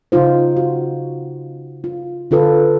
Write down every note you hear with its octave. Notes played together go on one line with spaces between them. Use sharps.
C#3 D#4 F4 C5
F#4
F4
D3 F4 A4 B4